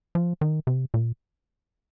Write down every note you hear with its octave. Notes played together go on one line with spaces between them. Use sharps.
F3
D#3
C3
A#2